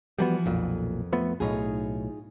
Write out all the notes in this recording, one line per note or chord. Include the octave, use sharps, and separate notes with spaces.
E3 F3 G3 A#3 B3 F#4
B1 F2 A#2
F3 A3 B3
B1 A2 D#4 F4 G#4